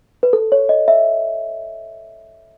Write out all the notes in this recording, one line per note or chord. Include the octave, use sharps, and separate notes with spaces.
B4
A4
C#5
D#5
E5